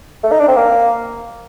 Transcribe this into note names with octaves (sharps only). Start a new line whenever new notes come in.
A3
D#4
D4
C4
A#3